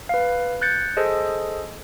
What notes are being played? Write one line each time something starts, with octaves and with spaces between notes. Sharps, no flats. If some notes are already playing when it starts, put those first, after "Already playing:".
B4 F5
F#6 G6 A6 C#7
G#4 A4 C5 D#5